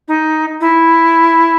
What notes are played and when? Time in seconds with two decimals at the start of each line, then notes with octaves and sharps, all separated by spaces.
0.08 D#4
0.61 E4